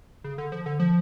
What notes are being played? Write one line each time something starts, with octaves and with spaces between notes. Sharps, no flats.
C#3
D3
F3
D3
F3